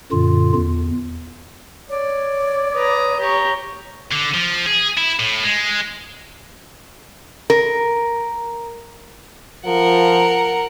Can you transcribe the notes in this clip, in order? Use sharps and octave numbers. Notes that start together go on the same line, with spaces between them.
F#2 A#2 D3 F4
E2
C#5 D5
B4 A#5 D#6
G4 A#5 C#6
D3
F3
G#4
E4
A2
G#3
A#4
F3 A#4 F#5